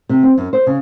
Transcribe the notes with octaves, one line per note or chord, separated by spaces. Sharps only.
C3
C4
F#2
C5
C#3